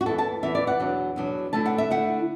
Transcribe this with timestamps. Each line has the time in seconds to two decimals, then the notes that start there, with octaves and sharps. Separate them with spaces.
0.01 F#4
0.06 E2 E3 B3 E4 A4
0.18 A5
0.43 E2 E3 B3 E4 E5
0.55 D5
0.67 F#5
0.80 E2 B2 F#3 D4
1.16 E2 B2 F#3 D4
1.53 D3 A3 E4 A5
1.66 F#5
1.78 E5
1.90 D3 A3 E4 F#5